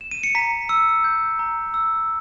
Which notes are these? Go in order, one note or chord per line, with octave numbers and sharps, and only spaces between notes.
E7
D#7
C#7
A#5 B6
E6 C#7
G6
A#5
E6